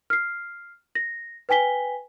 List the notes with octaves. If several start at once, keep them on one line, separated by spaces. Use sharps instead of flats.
F6 C7
A#6
B4 G5 G#5 B6 G7